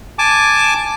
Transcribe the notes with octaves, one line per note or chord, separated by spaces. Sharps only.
G#5 A5 D6